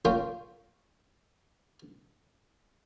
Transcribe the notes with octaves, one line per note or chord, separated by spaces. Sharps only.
A#3 C#4 F4 A#4 F5 G5